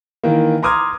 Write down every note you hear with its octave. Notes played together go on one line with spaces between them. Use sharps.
D#3 E3 A#3
A#5 C6 D6 D#6 F6 G#6